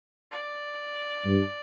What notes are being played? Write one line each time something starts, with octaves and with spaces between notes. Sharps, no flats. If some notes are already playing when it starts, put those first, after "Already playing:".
D5
G2